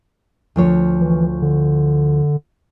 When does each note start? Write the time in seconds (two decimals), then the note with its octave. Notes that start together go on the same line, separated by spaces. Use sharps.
0.56 D2 F3 C#5
1.01 E3
1.42 D3